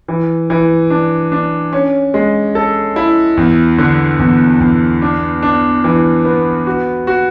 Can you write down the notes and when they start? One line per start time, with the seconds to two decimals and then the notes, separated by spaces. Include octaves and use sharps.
0.08 E3
0.50 E3
0.90 D4
1.32 D4
1.73 C#4
2.14 G#3
2.55 A4
2.96 E4
3.37 E2
3.78 D3
4.19 E2
4.60 E2
5.02 D4
5.42 D4
5.84 E3
6.25 B3
6.67 F#4
7.07 F#4